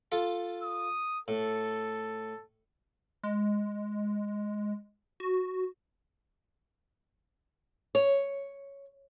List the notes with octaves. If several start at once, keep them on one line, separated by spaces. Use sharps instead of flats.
F4 A4
D#6
A2 A4
G#3
F#4
C#5